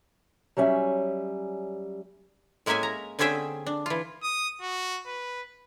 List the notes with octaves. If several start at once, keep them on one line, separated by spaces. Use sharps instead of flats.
F#3 G3 C#4 D#5 E5 G#5
A2 G#3 A#3 C#4 E5 G#5
A#5
D3 C4 C#4 G#4 E5 G5
D4
E3 F4
D#6
F#4
B4